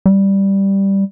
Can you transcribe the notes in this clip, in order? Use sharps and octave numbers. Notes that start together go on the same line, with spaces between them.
G3